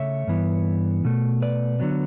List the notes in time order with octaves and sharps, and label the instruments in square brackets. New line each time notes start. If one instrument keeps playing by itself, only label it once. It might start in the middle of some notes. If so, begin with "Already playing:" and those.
Already playing: [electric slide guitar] C#3 A3 C#5 E5
G2 E3 B3
B2 A3
B4 D5
D3 F#3 B3